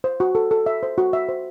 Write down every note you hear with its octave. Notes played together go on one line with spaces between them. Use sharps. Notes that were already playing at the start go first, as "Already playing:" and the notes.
C5
F#4
A4
A4
E5
C5
F#4
E5
C5